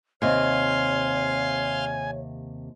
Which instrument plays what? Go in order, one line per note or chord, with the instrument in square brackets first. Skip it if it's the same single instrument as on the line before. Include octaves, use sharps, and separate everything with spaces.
[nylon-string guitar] D#2 C3 [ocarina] C#5 [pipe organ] F5 C6 [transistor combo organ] G#5